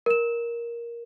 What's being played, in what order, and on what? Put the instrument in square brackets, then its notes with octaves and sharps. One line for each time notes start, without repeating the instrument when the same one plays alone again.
[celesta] A#4 E7